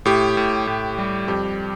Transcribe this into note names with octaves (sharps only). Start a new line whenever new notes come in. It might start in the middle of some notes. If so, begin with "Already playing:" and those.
A2 G4
A2
A2
G3
F2 G4